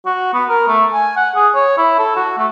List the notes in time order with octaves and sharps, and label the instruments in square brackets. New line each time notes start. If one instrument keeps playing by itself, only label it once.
[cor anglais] F#4
B3
A#4
A3
G#5
F#5
G#4
C#5
E4
A4
F#4
A3